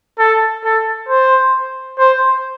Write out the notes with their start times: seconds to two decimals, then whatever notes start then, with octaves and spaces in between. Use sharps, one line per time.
0.19 A4
0.64 A4
1.09 C5
1.99 C5